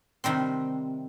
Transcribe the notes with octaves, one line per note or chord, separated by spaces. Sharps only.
C3 D#3 G3 C4